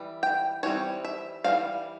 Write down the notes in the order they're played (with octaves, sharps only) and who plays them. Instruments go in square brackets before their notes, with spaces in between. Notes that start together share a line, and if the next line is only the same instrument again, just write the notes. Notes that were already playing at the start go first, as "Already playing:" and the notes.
Already playing: [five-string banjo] E3 G3
G5
E3 G3 C4 C#5
E5
E3 G3 C4 F5